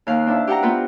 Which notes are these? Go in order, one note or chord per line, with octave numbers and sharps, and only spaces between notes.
D#2 F5 F#6
C4 D4 E4
G4 F#5 G5 A#5
B3 C4 F4 B4